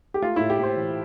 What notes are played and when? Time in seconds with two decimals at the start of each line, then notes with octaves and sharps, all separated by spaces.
0.14 G4
0.22 A3 F4
0.36 A2 E4
0.50 G4
0.59 A2 C5
0.77 E3